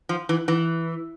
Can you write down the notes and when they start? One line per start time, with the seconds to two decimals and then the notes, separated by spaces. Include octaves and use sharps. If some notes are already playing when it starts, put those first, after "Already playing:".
0.09 F3
0.29 E3
0.48 E3